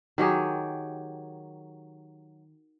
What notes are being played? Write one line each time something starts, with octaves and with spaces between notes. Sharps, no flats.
D#3 F#3 G4 G#4